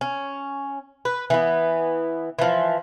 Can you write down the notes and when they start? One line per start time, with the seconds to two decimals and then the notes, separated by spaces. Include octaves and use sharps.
0.01 C#4
1.05 B4
1.30 E3 B3
2.39 E3 F3